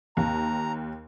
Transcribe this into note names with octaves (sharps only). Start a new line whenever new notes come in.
D#2 A#5